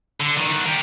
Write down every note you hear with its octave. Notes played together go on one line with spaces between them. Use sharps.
D3
D#3 E3
G3 F#5
G4 A#4